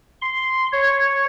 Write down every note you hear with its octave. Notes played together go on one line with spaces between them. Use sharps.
C6
C#5